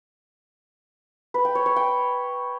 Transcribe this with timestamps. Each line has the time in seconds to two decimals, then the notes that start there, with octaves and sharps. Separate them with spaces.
1.34 B4
1.45 G5
1.55 C#5
1.66 C#5
1.76 G5